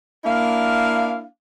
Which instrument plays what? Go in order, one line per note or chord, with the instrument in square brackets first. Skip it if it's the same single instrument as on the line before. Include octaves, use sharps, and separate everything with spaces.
[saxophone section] A#3 D4 E4 F5